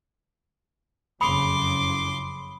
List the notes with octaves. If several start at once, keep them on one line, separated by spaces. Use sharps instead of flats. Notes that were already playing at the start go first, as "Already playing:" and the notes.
F#1 F2 C#3 B5 C6 D6 D#6